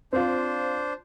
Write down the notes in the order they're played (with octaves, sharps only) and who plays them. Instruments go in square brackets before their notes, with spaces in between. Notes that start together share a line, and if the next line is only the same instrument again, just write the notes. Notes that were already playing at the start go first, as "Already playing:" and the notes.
[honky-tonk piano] C4 F4 [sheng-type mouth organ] D4 C5